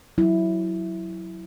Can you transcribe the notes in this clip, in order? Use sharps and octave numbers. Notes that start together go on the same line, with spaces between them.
F#3 E4